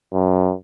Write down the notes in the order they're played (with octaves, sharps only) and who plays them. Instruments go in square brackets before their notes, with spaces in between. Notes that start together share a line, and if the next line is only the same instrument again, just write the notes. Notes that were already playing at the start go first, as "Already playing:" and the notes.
[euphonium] F#2